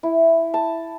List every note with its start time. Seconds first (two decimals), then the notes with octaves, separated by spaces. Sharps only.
0.03 E4
0.54 A5